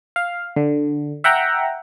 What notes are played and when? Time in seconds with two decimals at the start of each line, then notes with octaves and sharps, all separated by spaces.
0.16 F5
0.56 D3
1.24 E5 F#5 G5 A#5